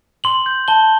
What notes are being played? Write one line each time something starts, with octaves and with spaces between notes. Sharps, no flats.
C6 F#7
G6
A5 G7